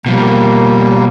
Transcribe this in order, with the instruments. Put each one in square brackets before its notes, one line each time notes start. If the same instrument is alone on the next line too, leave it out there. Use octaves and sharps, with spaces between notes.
[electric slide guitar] B2 F3 [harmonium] G3 A#3